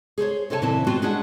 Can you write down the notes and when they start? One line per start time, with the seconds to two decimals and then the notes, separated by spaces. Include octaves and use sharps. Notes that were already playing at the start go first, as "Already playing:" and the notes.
0.18 G#4 A4 C5 C#5
0.50 C3 F4 A4 C#5 G#5 A5
0.62 A#2 C#3 E3 C4 E4 A5
0.87 B3 C4 F4 F#4
1.02 G#3 C#4 D4 F#4 G#4 F#5